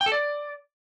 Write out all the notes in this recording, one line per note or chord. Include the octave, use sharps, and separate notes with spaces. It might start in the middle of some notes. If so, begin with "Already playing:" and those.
G5
A4
D5